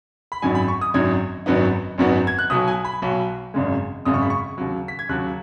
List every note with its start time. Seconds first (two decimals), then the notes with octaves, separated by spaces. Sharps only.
0.32 B5
0.42 G#1 F#2 F#3 D#4 G#5
0.55 B5
0.68 C#6
0.81 D#6
0.94 G#1 F#2 F#3 D#4 G#6
1.46 G#1 F#2 F#3 B3 D#4
1.98 G#1 F#2 F#3 B3 D#4
2.27 G#6
2.39 F#6
2.50 B1 B2 F#3 D#6
2.68 G#5
2.85 B5
3.02 B1 B2 F#3
3.54 G#1 F#2 C#3 G#3
4.05 G#1 F#2 C#3 G#3 D#6
4.14 C#6
4.22 B5
4.30 C#6
4.58 D#2 C#3 F#3
4.88 B6
4.99 G#6
5.09 D#2 C#3 F#3 F#6